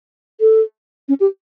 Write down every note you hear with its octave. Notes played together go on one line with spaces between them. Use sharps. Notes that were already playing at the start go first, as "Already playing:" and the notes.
A4
C#4
G4